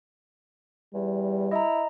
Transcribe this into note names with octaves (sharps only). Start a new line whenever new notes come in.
E2 G3
E4 D#5 A#5